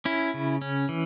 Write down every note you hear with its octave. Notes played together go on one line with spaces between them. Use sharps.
C#4 E4
C#3
C#4
E3